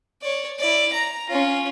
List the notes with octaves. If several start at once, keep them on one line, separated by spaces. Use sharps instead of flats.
C#5 D5
E4 D5
A#5
C#4 F4